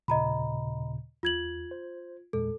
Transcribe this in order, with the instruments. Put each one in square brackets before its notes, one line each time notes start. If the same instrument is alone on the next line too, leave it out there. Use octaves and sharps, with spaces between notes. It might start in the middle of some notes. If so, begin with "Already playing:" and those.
[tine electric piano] D#2 A#2 C#3 [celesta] D#5 A#5 B5
[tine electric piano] E2 [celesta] F4 G#6 F#7
[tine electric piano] C5
[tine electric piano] E2 A#2 G#3 [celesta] A4